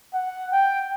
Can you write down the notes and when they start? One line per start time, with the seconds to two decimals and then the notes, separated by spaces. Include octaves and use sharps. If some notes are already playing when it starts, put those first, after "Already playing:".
0.14 F#5
0.53 G5